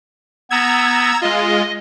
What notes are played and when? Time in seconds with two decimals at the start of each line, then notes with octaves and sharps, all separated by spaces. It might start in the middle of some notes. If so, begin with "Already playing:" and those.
0.50 B3 A#5 E6 G#6
1.22 G#3 F4 D#5